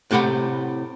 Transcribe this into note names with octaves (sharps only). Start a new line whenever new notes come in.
A2 C3 G4 F#5 B5